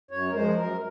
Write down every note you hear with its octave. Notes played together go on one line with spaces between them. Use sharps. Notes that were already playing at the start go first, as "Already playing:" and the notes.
F#2 C#5
A#4
F3 G#3 C5
F#2 A#4